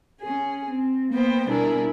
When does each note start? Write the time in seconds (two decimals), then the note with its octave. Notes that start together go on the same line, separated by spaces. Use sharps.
0.21 C#4 G#4
0.71 C4
1.11 A#3 B3 C5 G5
1.48 B2 G3 D4 E4 G#4 A#4